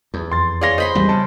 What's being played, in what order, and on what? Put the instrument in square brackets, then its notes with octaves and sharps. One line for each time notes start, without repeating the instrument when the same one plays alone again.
[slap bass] E2
[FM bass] F2 [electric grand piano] C6 A6
[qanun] G#4 C#5 C6 [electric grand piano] D5 F5 A#6
[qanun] C5 B5 C6 [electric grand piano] D#5
[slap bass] G#1 E2 [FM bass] G3
[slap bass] C#3 [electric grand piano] A5